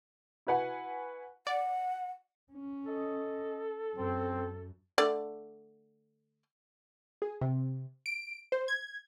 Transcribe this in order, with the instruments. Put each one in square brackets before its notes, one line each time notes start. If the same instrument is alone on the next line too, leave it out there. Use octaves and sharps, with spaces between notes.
[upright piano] E4 F#4 B4 F#5 G#5
[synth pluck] D5 [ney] F#5
[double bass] C#4
[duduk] A4 [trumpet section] D#5
[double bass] F#2 [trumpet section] C4
[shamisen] D3 A3 D5
[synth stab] G#4
C3
D7
C5
G#6